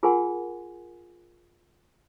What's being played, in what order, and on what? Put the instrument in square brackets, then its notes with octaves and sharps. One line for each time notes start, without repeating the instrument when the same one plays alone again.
[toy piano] F4 G#4 A#4 F#5 G#5 C6